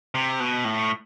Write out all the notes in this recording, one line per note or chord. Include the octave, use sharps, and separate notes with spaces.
C3
B2
A2